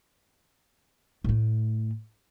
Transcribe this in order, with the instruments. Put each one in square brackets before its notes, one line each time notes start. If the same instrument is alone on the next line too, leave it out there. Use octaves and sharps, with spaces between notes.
[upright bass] A2 A3